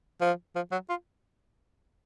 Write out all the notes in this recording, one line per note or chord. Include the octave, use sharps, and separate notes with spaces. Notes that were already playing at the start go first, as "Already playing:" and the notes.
F3
F3
F#3
F4